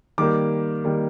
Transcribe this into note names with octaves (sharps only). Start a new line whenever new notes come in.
D#3 G3 A#3 D6
D#3 G3 A#3